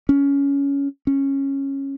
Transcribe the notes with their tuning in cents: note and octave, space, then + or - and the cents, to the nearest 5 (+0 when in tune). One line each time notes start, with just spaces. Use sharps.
C#4 +15
C#4 -15